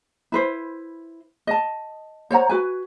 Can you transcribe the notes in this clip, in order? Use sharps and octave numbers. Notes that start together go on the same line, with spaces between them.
E4 B4 C5
D#5 A5
C5 C#5 F#5 A#5
F#4 B4 G#5